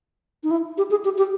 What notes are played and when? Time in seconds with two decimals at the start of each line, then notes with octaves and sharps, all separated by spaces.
0.43 D#4
0.51 E4
0.78 G4
0.91 G#4
1.05 G4
1.18 G4